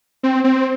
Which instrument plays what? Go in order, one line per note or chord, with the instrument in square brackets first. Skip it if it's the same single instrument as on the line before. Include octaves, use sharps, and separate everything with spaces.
[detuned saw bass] C4
C4